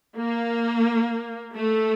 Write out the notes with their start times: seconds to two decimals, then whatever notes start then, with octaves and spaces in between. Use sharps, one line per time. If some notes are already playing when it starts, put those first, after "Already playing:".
0.17 A#3
1.54 A3